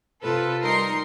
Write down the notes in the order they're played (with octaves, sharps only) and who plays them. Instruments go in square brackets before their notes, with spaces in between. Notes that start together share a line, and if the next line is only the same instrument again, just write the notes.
[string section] C3 F4 A4 B4
G3 D#4 A#4 C6 C7 C#7